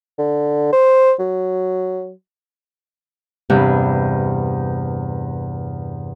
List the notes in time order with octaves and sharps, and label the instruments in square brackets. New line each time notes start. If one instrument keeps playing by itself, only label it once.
[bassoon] D3
C5
F#3
[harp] E2 G2 C3